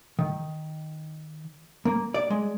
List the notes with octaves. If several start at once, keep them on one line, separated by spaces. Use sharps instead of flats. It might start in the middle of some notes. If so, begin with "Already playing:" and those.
D#3
A#3
D5
G#3